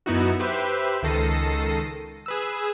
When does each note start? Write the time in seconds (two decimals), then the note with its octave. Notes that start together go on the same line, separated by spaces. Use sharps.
0.06 F#2 B3 D#4 E4 F#4
0.40 G4 B4 C5 E5
1.03 C#2 D#3 A4 A#6 C7 D#7
2.26 G#4 B4 E6